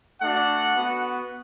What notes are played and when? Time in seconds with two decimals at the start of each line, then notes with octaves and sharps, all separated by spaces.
0.21 A3 D4 F#4 F#5
0.75 B3 F#4